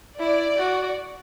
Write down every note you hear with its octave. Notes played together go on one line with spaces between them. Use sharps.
E4 D5
F#4